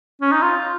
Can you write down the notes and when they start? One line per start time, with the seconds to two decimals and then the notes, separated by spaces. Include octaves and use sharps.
0.21 C#4
0.32 D#4
0.42 F4